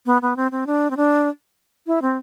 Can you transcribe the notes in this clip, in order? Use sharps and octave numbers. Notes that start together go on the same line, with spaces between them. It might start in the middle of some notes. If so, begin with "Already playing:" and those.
B3
B3
C4
C4
D4
C4
D4
E4
C4